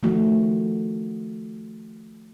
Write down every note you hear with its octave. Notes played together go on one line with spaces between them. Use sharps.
D#3 F3 A3 F#4